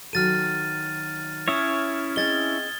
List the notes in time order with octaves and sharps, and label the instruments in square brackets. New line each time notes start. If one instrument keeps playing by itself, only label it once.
[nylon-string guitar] D#3 F#3 A4 [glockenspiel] F6 A6 D#7
[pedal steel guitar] C#4 E4 C#5 [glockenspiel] D#6 E7
[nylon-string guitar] C4 G#4 D#5 [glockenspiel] G#6 A6 G7